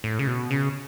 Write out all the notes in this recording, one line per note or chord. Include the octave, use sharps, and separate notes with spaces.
A2
C#3
B2
C#3